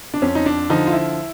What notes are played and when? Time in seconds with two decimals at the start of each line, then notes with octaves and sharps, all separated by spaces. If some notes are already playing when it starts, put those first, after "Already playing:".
0.14 D4
0.22 F2 C#4
0.35 D#4
0.46 D4
0.69 D3 F3 D#4
0.87 F4
0.92 E4